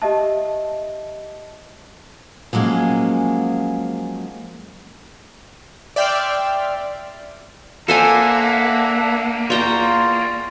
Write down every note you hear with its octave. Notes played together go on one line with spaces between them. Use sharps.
G4 D#5 E5 A5
F3 F#3 G#3 A#3 C#4
D5 E5 G5 C6 F6
A#3 D4 A4 C5 E5 F#5 G#5
E2 E3 F4 C#5 D5 G5 A#5